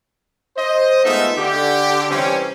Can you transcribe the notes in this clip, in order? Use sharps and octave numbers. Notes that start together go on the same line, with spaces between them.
C5 D#5
G#3 A3 B3 D#4 F4 E5
D3 G4
C3 E3 G3 C4 C#4